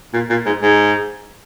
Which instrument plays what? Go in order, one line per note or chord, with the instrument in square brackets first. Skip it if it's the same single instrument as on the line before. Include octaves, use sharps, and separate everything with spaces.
[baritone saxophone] A#2
A#2
G#2
G#2